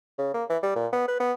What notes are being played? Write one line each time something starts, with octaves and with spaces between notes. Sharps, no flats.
C#3
A#3
E3
G3
A#2
B3
B4
B3